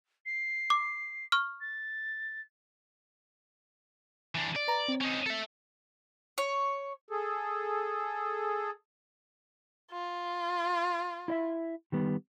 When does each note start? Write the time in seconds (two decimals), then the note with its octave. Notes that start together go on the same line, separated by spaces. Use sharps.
0.26 C7
0.70 D6
1.32 C#6 F6
1.61 A6
4.35 E3 D4
4.56 D5
4.68 B4 A#5
4.88 C4
5.01 C#4 D#4
5.26 A4 E5
6.38 C#5
7.11 G#4 A4
9.92 F4
11.28 E4 D#5 E5
11.92 D#3 G3 B3